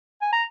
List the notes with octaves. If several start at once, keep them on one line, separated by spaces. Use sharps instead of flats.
G#5
A#5